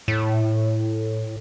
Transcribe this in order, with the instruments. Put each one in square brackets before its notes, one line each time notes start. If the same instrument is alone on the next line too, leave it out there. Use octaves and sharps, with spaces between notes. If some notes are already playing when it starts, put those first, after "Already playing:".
[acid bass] A2